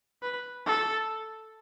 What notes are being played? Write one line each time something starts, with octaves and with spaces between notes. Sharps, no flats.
B4
A4